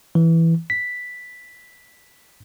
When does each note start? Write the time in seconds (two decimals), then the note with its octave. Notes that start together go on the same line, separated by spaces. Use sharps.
0.15 E3
0.70 B6